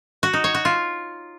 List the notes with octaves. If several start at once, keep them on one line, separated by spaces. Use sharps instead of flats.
F#4
D#4
C#5
F#4
F4